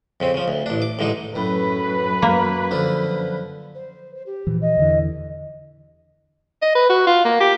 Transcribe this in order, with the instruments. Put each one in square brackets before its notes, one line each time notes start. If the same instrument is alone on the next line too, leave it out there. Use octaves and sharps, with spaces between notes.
[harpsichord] F2 C#3 C4
C#3 F3
D2
A1 D4
D6
A1 D3 G#3 D#4
[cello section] F#2 B4 [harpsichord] A2
[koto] A#3
[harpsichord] D3 F3
[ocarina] C5
C5
G4
[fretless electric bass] A#2 E3 F3
[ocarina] D#5
[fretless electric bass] E2 D3 E3
[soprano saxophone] D#5
B4
F#4
F4
A#3
G4